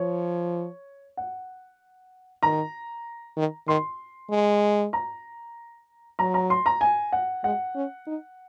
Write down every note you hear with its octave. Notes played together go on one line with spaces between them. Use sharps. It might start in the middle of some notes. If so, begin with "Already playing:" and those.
Already playing: F3 C#5
F#5
D#3 A#5
D#3
D#3 C6
G#3
A#5
F#3 A#5
A#5
C6
A#5
G#5
F#5
G#3 F#5
C#4
D#4